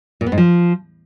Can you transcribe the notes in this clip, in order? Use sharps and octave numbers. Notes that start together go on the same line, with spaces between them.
A#2
B3
G#2
F3